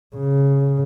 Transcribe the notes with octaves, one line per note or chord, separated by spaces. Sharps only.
C#3